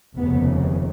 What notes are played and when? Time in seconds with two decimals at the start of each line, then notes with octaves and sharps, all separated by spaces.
0.17 F1 D#2 C#3 B3